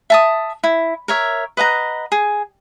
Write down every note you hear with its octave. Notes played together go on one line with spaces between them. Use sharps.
E5 A5 D#6
E4
A#4 C#5 E5
B4 D#5 F#5 A#5
G#4